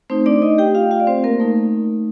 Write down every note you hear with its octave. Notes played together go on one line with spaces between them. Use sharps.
A3 C4 D#4 C5
D4 D5
D#4 D#5
G4 G5
F4 F5
F4 F5
D5
C4 C5
A#3 A#4
A3 D#4